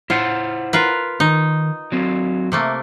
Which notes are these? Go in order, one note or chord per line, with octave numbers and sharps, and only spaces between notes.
E4 F4 C5 F#5
F4 A#4 B4
D#3 D#4
F#3 C4
C3 A3 A#3